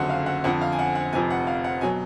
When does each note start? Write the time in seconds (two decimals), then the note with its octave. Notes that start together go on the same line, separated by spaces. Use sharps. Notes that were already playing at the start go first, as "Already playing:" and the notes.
Already playing: F#1 F2 D3 F#3 F#5
0.09 F5
0.26 F#5
0.44 F2 D3 F3 F#5
0.61 F5
0.72 G#5
0.79 F#5
0.95 F#5
1.13 F1 F2 F3 G#5
1.30 F#5
1.47 F5
1.64 F#5
1.81 B2 F#3 G#5